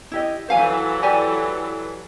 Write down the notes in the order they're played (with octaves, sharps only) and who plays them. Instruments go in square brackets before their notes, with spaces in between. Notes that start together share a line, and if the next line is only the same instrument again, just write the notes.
[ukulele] E4 G4 D#5
[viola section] E3 F#3 A4 [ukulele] C5 F5 G#5
[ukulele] G4 D5 G#5